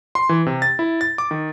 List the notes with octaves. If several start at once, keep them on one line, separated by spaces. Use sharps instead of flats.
C6
E3
C3
A6
E4
A6
D6
D#3